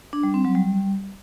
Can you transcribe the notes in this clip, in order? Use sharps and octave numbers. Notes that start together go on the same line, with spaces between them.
D4
G3
C4
F#3
G3